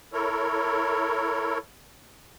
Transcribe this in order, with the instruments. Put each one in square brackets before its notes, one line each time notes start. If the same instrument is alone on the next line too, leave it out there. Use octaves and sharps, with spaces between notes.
[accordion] E4 A4 A#4 C#5